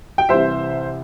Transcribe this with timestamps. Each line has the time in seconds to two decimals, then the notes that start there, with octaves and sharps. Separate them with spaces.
0.18 G5
0.29 C2 C3 E3 C5 E5